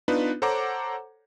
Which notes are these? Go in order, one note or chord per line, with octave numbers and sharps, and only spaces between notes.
B3 D4 D#4 F4 B4
A4 C5 C#5 F#5 A#5 D6